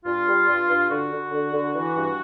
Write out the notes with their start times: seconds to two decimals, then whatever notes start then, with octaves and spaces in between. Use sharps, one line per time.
0.05 G2 F4
0.27 G3
0.47 G2
0.69 G2
0.90 D3 F#4
1.11 D3
1.33 D3
1.54 D3
1.75 E3
1.95 G2